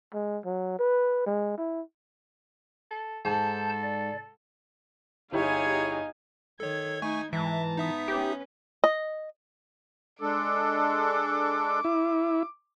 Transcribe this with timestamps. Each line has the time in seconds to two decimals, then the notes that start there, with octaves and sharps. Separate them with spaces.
0.13 G#3
0.45 F#3
0.79 B4
1.27 G#3
1.58 E4
2.91 A4
3.25 G#2 A4 A5 G6
3.82 D5
5.33 G1 D#4 E4 G4 G#4 C#5 F5 G#5
6.60 D#3 A4 C#5 G#6
7.02 A3 D#4 G#5 C#6
7.33 G#2 E3 G#3 E5 A5 A#5
7.77 B3 D#4 E5 D#6
8.08 C#4 G4 B4
8.84 D#5
10.21 G#3 D4 A4 D6
11.84 E4